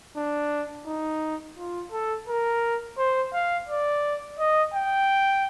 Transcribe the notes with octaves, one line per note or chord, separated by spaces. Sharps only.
D4
D#4
F4
A4
A#4
C5
F5
D5
D#5
G5